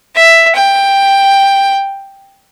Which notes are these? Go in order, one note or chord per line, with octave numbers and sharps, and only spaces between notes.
E5
G5